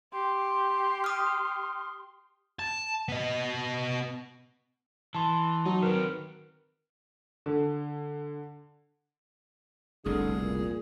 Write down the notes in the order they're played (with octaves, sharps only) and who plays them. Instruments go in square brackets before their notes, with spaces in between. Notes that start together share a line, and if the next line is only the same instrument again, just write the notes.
[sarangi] G4 [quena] C6
[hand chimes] D#6 F6
[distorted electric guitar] A5
B3 D#5
[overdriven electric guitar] E3 [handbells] A5 C6
[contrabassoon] F#3 [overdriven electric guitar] D#4
[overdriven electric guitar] D#3 C4 [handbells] A#4 B4
[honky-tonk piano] D3
[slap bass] F1 C2 B2 [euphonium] D3 [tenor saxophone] G#4
[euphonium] A#2